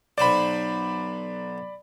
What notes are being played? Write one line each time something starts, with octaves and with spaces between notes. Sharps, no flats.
B1 F#3 C5 D5 B5